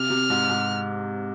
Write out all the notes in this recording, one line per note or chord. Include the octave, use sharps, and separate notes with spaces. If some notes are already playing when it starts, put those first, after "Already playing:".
Already playing: C3 F6
C3
G#2
G#2